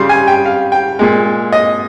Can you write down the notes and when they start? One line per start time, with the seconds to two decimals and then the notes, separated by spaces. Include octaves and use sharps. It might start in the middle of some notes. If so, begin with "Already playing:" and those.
Already playing: C#3 G3 C6
0.09 G#5
0.28 G5
0.45 F5
0.72 G5
0.99 A#2 G#3
1.52 D#5